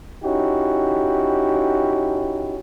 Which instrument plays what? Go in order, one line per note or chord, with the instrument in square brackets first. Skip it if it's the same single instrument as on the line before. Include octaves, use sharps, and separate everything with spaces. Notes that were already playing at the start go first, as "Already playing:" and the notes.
[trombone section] C#4 D#4 E4 F#4 G4